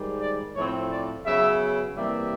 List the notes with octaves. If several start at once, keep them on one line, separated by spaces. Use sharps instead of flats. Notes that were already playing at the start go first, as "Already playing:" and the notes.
Already playing: G#2 D#3 G3
D5
A2 F3 A3 C4 C#5
D5
C#3 F#3 B3 E5
C3 E3 G3 A#3 E5